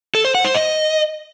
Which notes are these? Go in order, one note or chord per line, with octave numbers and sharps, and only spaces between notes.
A4
C5
F#5
C5
D#5